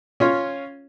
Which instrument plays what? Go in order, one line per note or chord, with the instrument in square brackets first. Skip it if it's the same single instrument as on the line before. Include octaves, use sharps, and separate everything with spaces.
[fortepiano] C#4 F4 C#5